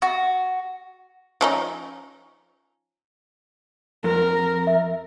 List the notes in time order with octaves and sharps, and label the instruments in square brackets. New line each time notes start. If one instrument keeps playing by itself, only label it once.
[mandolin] F#4
[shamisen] F3 C#4 D#4
[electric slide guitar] F2 [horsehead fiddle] A#4
[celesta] E5